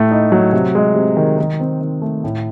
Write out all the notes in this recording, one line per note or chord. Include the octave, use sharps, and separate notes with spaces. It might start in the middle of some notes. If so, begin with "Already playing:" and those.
Already playing: A2 A3
D#4
F#3
C3
G#3
C3
D#3
D#3
C4
D#3
A3
A2